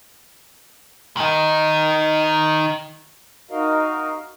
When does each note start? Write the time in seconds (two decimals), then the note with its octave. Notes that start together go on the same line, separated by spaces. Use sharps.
1.17 D#3 D#4
3.51 D#4 F#4 A#4 D#5 F5